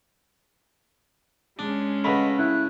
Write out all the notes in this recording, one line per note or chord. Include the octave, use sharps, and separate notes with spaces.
G#3 C#4 D4
C#3 A3 B4 D#5 F#5 B5
E4 F#6